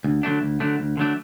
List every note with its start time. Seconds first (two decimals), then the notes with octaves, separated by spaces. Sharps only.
0.04 D2
0.23 D3 F#3 A3 D4
0.42 D2
0.60 D3 F#3 A3 D4
0.79 D2
0.97 D3 F#3 A3 D4